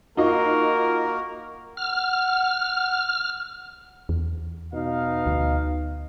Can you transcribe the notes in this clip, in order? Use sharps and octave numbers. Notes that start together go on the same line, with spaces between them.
A#3 D#4 F4 F#4 A#4 D#5
F#5 F6
E2
B2 D#4 F5
D2